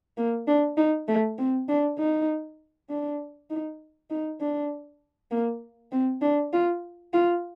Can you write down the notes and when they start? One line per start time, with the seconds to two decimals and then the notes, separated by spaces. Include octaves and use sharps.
0.17 A#3
0.48 D4
0.77 D#4
1.08 A3
1.38 C4
1.69 D4
1.99 D#4
2.89 D4
3.50 D#4
4.10 D#4
4.40 D4
5.31 A#3
5.92 C4
6.22 D4
6.53 F4
7.13 F4